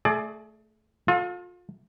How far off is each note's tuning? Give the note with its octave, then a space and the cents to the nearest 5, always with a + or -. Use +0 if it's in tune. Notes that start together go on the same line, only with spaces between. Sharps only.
A3 +0 G#4 +35 D5 +20
F4 +35 A4 +0